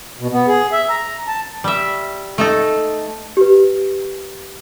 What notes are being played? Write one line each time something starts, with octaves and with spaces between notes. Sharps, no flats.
B2
B3
G#4
E5
A#5
A5
G3 E5
A3 D#4 A4
G4 B4